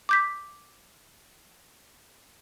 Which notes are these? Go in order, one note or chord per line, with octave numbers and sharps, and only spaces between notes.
D6 G6 B6